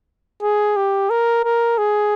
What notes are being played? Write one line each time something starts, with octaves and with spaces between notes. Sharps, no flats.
G#4
G4
A#4
A#4
G#4